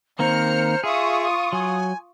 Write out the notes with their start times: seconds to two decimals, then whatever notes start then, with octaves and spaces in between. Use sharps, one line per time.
0.19 D#3 A#3 C4 C5 A#5 F6 C#7
0.84 F4 G#4 E5 C#6 D#6
1.53 F#3 G#5